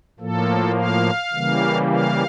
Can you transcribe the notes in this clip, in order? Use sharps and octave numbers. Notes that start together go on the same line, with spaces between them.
A2 F3 A#3 A4
F5
C#3 E3 G3 A#3
F5